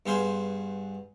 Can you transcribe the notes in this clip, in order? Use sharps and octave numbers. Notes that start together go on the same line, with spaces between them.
G2 B3 G#4 C5 F5 C6